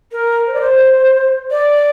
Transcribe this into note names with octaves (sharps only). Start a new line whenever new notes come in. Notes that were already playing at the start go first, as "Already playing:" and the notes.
A#4
C5
D5
C5
D5